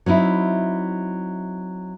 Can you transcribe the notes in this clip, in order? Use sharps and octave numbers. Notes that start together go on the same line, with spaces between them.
F#3 C4 D#4 E4